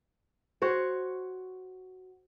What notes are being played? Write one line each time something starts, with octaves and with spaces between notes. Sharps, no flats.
F#4 C5 C#5